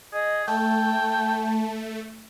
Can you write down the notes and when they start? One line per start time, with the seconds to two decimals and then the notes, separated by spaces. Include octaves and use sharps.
0.13 G#4 D#5
0.48 A3 G5 A5